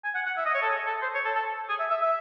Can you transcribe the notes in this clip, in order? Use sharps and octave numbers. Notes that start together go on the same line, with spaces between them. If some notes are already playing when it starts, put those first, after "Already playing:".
G#5
F#5
F#5
E5
D#5
C#5
A4
G#4
A4
C5
C#5
A4
A4
G#4
E5
E5
E5